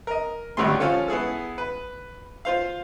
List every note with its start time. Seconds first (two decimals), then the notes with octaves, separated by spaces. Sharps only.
0.07 A#4 D#5
0.57 G#1 C#2 D3 G3 A3 C6
0.80 F3 C#4 F4 A4
1.08 B3 E4 G#4 A4
1.58 B4
2.45 F4 C5 F5